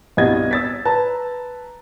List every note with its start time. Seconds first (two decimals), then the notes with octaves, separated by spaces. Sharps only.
0.17 C2 G2 B2 D#5 F#5 G#6
0.51 E6 A6 B6
0.85 B4 A5 A#5